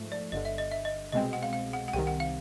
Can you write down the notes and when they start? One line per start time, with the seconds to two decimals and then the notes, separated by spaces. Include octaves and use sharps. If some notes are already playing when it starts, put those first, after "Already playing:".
Already playing: G#2 F3 A3
0.12 D5
0.32 G1 G2 D3 D#5
0.45 E5
0.58 D#5
0.71 E5
0.85 D#5
1.12 C2 B2 G#3 C4 D#5
1.33 F#5
1.43 F5
1.53 F5
1.73 F#5
1.88 F#5
1.93 C2 C3 D#3 G5
2.07 F#5
2.20 F5